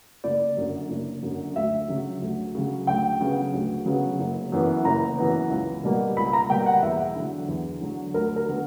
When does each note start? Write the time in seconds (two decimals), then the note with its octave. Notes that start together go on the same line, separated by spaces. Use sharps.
0.24 F#1 D5
0.57 F#2 D3
0.90 F#1
1.23 F#2 D3
1.56 D2 E5
1.88 C#3 F#3
2.22 D2
2.55 C#3 F#3
2.87 D2 G5
3.21 C#3 F#3 B3
3.53 D2
3.86 C#3 F#3 B3
4.19 F#1
4.52 F#2 E3 B3
4.85 F#1 A#5
5.17 F#2 E3 B3
5.51 C#2
5.84 B2 G3 A#3
6.17 C#2 B5
6.33 A#5
6.50 B2 G3 A#3 G5
6.66 F#5
6.82 E2 E5
7.16 D3 F#3
7.48 E2
7.81 D3 F#3
8.14 D2 A#4
8.36 A#4
8.47 D3 F#3 B3